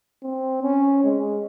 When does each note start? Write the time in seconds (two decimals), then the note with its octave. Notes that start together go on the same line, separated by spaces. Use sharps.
0.23 C4
0.63 C#4
1.04 G#3